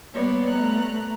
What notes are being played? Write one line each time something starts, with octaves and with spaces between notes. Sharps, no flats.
G3 A#3 B3 C#5 D5
A3 B3 A#5 F#6